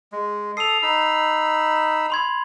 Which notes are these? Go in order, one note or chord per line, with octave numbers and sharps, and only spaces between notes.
G#3
A4 D#6 C7 F7
D#4 B5 E6
B5 C6 G#6